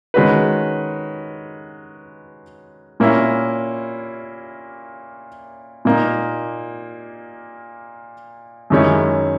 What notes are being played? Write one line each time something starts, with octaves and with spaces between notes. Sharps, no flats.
D#3 G#3 C#4 F#4 B4
A#2 A#3 C#4 E4
A#2 A#3 D#4
F#2 D#3 G#3 C#4 E4